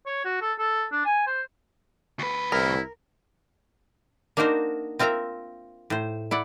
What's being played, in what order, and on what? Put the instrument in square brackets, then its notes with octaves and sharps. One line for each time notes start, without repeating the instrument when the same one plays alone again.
[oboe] C#5
F#4
A4
A4
D4
G#5
C5
[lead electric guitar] D2 B4
[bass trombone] C2 [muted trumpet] E4 [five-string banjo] A#4
[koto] A#3 D4 D#4 F#4 A#4 C5
C4 F4 A#4 E5 A#5
A2 C5
E4 D5 F#5